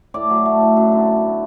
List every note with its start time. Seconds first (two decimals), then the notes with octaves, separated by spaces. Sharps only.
0.14 A2 D5
0.30 F#3
0.45 A3
0.61 A2
0.76 F#2
0.92 D3
1.07 B3